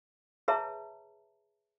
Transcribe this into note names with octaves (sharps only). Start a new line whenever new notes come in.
G#4 B4 C#5 E5 A5 A#5